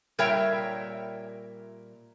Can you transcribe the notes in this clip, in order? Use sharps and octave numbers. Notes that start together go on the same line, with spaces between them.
A#2 G3 A#4 C#5 E5 G5